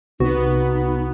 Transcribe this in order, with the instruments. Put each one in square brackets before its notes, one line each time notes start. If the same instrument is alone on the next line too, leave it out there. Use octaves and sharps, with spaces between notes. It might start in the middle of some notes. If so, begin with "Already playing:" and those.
[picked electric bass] C2 [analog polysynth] B3 [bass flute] D#4 [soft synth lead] F#4